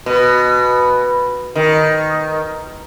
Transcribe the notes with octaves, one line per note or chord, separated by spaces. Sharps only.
B2
D#3